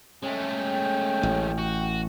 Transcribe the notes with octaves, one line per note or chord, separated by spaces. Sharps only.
G#3 A3 C#4 G5
A1
F#4